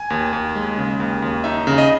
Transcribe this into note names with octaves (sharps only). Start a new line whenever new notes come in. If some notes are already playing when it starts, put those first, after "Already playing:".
Already playing: G#5
D#2
D#2
G#3
C#3
D#2
D#2
D#4 E5
C#3
D#5